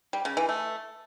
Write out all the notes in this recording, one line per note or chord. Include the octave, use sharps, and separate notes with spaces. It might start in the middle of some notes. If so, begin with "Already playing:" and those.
G3
C#3
E3
A3